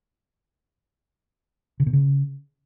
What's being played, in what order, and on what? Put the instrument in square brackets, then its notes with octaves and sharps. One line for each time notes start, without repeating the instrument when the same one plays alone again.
[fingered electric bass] C#3
A#2
C#3